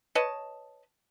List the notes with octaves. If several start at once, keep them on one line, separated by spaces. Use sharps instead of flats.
B4 C#5 D#5 A5